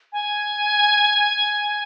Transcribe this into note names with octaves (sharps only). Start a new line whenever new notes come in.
G#5